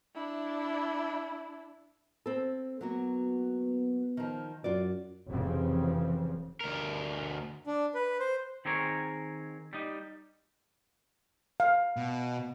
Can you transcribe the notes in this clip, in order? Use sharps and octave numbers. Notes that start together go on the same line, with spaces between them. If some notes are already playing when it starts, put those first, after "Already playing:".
D4 E4
C4 A4
F#3 A#3 B3 F#4
D#3 F3
F#2 F4 F#4 D5
F1 F2 C#3 E3 F3 C4
D2 A#4
D4
B4
C5
D#3 C4 G#4 A#4 C#5
G3 D#4
F5
B2